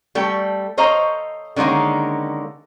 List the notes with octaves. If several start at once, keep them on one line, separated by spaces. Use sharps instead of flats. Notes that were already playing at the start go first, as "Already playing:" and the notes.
G3 A3 A4 G5
A4 C5 C#5 D#5 F5 A#5
D3 D#3 G#3 A#3 C#4